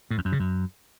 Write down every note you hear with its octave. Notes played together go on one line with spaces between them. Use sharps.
A2
F2
F#2
C#3
F#2